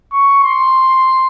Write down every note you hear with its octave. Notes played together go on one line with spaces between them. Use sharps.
C#6
C6